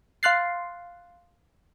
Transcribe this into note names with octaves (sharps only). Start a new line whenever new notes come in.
F5 C6 F6 F#6 A6 C7